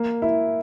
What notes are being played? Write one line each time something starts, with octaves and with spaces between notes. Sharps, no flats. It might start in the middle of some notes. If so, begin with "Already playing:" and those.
Already playing: A#3
E4